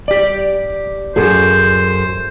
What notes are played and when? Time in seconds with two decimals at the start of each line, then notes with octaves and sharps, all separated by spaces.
0.08 G4 D5
1.16 F#2 G#4 A4 C5